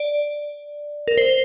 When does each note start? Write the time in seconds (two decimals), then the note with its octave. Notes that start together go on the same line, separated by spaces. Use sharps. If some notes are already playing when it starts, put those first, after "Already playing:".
Already playing: D5
1.08 A#4
1.18 C5